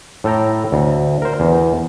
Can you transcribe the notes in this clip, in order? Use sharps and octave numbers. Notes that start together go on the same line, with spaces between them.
A2 A4 G5 A#5
D2
A#4 C5
E2